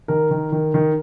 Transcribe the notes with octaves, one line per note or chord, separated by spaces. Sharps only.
D#3 A#4
D#3
D#3
D#3